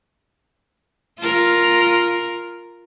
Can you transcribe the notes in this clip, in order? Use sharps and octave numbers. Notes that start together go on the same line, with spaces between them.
F4 A#4